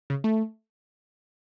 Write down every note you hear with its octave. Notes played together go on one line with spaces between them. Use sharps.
C#3
A3